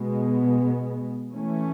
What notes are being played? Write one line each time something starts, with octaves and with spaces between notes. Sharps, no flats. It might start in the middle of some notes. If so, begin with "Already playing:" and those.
Already playing: B2 G#3 B3
E3 A3 C#4